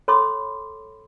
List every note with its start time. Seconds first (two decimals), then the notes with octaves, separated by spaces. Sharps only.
0.08 A4 C#5 B5 C6 D6 D#6